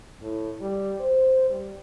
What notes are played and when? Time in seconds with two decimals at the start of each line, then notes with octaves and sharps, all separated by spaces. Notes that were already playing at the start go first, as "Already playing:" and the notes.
0.22 A2
0.61 G3
1.00 C5
1.50 G3